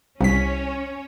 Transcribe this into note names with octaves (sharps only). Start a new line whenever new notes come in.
C2 C#4 C#5 B6